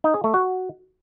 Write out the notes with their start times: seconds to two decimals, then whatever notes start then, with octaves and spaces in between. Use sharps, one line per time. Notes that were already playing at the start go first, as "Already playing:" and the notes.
0.04 D#4
0.14 G#4
0.24 A3
0.34 F#4